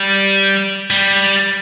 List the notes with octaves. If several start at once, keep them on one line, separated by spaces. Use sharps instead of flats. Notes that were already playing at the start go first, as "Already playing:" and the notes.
Already playing: G3
G3